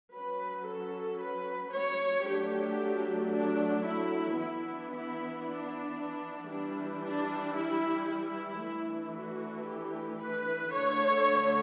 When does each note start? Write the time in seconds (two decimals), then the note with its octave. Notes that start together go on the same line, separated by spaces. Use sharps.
0.14 F#3 C#4 B4
0.68 A4
1.21 B4
1.73 C#5
2.26 F#3 A3 D4 G4
3.32 D4
3.85 E4
4.38 E3 B3 D4 E4
4.91 E4
5.44 D4
6.50 E3 G3 D4
7.03 D4
7.56 E4
8.09 E4
8.62 E3 A3 D4
9.14 F#4
9.67 G4
10.20 B4
10.73 D3 A3 D4 C#5